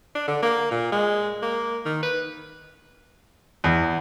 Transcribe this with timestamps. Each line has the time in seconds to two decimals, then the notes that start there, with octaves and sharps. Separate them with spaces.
0.15 D4
0.28 D3
0.42 A#3
0.71 A#2
0.92 G#3
1.42 A#3
1.85 D#3
2.03 B4
3.64 E2